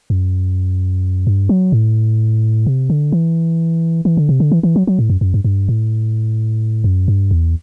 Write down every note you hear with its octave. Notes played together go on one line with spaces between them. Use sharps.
F#2
G2
F#3
A2
C3
D3
E3
E3
D3
C3
D3
E3
E3
F#3
F#3
A2
F#2
F#2
G2
G2
A2
F#2
G2
E2